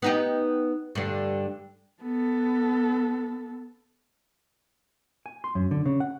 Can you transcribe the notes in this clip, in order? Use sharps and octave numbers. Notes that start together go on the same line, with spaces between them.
B3 D#4 G4
G2 D3
B3 A4
G#5
C6
F#2
D3
C#3
F#5